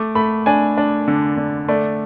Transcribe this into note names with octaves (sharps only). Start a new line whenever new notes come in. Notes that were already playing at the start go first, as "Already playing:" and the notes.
Already playing: A3 D6
A3 B5
D4 G#5
D4
D3
D3
A3 D5